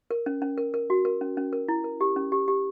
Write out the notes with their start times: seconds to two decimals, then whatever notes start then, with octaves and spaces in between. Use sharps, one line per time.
0.11 A#4
0.26 C#4
0.42 C#4
0.58 A#4
0.74 A#4
0.90 F#4
1.05 A#4
1.21 C#4
1.37 C#4
1.53 A#4
1.68 E4
1.84 A#4
2.01 G4
2.16 C#4
2.32 G4
2.48 G4